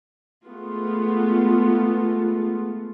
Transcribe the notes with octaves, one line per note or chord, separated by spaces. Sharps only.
G#3 A3 B3 F4